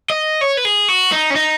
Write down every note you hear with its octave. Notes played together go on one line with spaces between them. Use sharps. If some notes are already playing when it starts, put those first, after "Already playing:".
D#5
C#5
B4
G#4
F#4
D#4
C#4
D#4